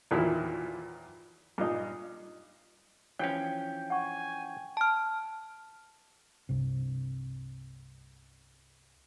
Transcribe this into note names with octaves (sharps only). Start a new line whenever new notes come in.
E2 A#2 D#3 F3 F#3 E4
G2 A#2 D#4
E3 F3 C#4 G5
F#5 G#5 C#6
A5 F6
C2 G2 C3